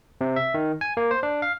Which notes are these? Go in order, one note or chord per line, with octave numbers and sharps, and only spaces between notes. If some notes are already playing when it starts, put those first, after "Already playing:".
C3
E5
D#3
G#5
A#3
C5
D4
F5